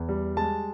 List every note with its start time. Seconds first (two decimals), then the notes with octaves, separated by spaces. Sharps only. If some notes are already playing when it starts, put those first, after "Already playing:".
Already playing: E2
0.09 G3
0.37 G#3 A5